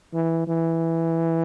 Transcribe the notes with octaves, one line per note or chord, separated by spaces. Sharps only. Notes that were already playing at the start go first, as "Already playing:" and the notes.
E3
E3